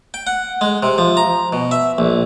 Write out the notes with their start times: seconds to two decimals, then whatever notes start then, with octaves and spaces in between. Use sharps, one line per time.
0.14 G5
0.27 F#5
0.61 G#3
0.83 C3
0.98 F3
1.17 A#5
1.53 B2
1.71 E5
1.98 A#1